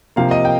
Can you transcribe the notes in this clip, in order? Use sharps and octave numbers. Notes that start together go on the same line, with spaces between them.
C3 F3 A#3 F5
D#5
G5